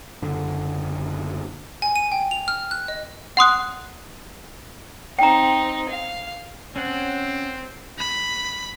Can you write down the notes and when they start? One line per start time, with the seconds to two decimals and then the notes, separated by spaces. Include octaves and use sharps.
0.22 F#1 D3
1.82 G#5
1.96 D#7
2.12 G5
2.31 F7
2.48 F6
2.71 F#6
2.88 D#5
3.37 F#5 C6 D#6 F#6
5.19 C4 D#4 G5 A#5
5.89 F5
6.76 C4 C#4 F#5
7.99 B5